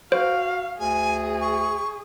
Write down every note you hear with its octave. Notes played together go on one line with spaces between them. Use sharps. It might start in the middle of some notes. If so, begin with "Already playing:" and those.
F#4 C5 F5
D2 G#4 G#5
C#6